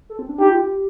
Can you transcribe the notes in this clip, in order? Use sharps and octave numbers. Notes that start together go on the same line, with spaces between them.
A4
C4
D4
D#4 G4
F4
G4